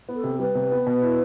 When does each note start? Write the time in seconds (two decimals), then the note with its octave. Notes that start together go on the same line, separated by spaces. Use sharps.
0.09 B3
0.15 A4
0.24 C3
0.39 G3 B4
0.55 C3
0.72 B3
0.86 B2
1.02 E4